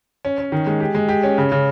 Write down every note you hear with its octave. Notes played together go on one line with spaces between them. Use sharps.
C#4
C#4
D#3
G#3
G4
G#3
G4
C#4
C#3
C#3